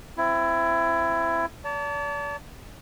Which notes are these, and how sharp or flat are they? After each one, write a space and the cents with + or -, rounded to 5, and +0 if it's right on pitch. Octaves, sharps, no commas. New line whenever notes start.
C4 -10 E4 +20
D5 -40 A5 +25